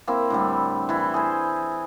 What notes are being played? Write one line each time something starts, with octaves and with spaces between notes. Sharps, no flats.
A#3 C4 E4
A2 D3 G3
E3 E4
G#4 C5